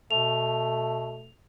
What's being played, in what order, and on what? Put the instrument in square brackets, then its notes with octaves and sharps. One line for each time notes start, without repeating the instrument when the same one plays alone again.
[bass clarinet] B2 [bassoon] A3 [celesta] F7